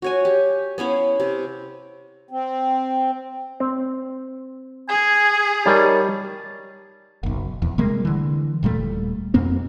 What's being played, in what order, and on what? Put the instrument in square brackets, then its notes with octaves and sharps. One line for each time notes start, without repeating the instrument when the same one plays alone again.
[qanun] F#4 C#5 G#5
G4
B3 C#4 E4 F5
C3
[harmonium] C4
[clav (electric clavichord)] C4
[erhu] G#4 [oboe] G#5
[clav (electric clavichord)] G3 D5 [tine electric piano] D#4 A#4 C#5 [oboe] A5
[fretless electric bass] F#1 B1
D#1 E2
C3 G3 G#3 A#3
D3 E3
D#1 A#2 G3 A3
F2 B2 A#3 C4